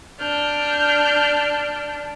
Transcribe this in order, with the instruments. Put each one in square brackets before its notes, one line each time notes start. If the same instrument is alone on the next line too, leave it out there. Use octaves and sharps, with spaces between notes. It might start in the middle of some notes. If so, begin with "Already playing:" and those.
[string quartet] D4 [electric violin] F6 G6